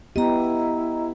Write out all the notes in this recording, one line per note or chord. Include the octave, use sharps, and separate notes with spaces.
B3 E4 G4 D#5 A#5